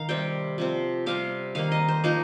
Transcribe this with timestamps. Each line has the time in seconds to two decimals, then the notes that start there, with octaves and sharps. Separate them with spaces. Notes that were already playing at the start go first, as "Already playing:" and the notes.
Already playing: D#3 F5
0.09 C3 G3 C4 G5
0.58 C3 F3 C4
1.06 C3 G3 C4 F5
1.55 D#3 A#3 F5
1.72 D#5
1.88 C5
2.04 F3 A#3 D#4